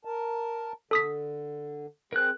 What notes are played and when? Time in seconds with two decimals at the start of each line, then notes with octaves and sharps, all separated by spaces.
0.05 A#4 A5
0.91 D3 A4 D#6 B6
2.13 C4 G#4 A#4 F#6